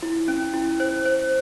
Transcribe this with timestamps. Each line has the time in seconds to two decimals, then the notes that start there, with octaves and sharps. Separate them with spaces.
0.02 E4
0.28 C#4
0.54 E4
0.80 C5
1.05 C5